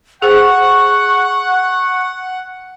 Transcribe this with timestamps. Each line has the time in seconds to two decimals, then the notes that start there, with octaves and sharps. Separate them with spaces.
0.22 G#4 C5 F#5 C#6